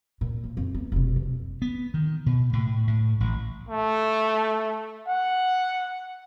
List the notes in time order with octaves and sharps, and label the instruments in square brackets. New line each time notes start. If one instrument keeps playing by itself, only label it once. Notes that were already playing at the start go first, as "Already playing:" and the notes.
[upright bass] A#2
F3
F2
B3
F1 B2
F2
[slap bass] B3
D#3
B2
A2
A2
A1
[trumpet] A3
F#5